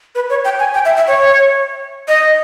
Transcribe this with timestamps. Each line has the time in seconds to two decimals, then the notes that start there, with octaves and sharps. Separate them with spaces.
0.15 B4
0.30 C#5
0.45 G5
0.59 G#5
0.74 G5
0.85 E5
0.97 E5
1.08 C#5
2.08 D#5